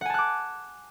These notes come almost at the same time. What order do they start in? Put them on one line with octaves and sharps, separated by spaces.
F#5 G#5 A5 F#6 D6